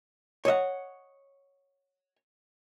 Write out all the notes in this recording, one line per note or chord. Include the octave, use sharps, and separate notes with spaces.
C#5 D#5 E5 F#5